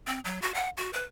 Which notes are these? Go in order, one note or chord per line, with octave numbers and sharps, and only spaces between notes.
C4
F#3
F#4
F#5
F#4
B4